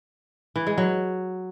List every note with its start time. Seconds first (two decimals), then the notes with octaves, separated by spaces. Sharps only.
0.56 E3
0.67 G#3
0.78 F#3